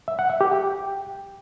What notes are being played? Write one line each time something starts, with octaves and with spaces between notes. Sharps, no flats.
E5
F#5
E5
G4
G5